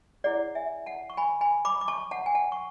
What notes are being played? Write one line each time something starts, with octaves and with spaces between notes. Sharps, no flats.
E4 G#4 C#5 D5 F#5
E5 G#5
F#5 A5
C#6
G#5 B5
G#5 B5
B5 D6
D6
A5 C#6
F#5 A5
G#5
F#5 A5
C#6